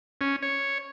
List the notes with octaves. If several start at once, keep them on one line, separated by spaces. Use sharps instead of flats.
C#4
C#5